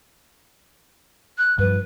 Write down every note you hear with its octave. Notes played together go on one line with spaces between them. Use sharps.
F#6
G2 F3 B4